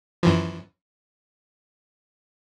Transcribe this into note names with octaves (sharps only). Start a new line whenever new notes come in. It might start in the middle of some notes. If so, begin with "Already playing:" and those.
F#2 E3 F3